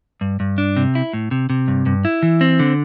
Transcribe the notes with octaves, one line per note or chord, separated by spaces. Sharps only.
G2
G2
D4
C3
E4
A2
C3
C3
G2
G2
E4
E3
C4
D3